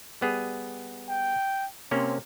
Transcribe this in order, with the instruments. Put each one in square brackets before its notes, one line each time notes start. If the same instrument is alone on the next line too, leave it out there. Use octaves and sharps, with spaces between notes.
[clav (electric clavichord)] G3 B3 G#4
[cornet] G5
[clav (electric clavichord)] C3 A#3 C#4 [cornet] C4